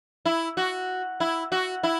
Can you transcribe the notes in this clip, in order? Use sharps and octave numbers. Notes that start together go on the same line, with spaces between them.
E4
F#4
E4
F#4
E4